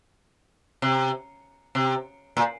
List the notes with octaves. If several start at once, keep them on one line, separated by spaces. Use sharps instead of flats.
C3
C3
A#2